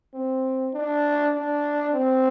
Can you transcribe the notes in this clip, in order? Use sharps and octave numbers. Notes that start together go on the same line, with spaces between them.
C4
D4
D4
C4